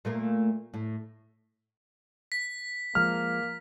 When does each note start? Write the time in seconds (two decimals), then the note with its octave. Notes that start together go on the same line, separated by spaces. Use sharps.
0.05 A#2 A3 A#3
0.74 A2
2.32 B6
2.95 F3 G#3 A#3 F6